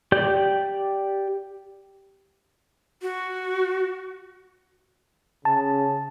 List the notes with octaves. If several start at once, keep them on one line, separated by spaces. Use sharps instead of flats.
G4 D5 G6
F#4
C#3 A5